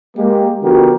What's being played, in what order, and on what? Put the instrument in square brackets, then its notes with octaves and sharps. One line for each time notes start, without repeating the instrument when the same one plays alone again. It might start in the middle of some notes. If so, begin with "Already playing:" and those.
[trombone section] G#3 A#3 G4
D3 F3 B3 F#4 G4 A#4